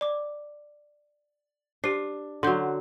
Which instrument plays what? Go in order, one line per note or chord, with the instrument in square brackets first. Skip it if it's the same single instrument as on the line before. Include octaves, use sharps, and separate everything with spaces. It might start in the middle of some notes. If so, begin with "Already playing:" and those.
[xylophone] D5 D6
[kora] D4 [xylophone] G4 C5 C7
[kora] D3 F#3 [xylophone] C6 G6 G7